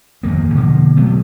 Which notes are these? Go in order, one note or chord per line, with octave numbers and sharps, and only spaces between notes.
F2 D#3 A#3
B2 D3 F3 A#3
B2 F#3 A3 B3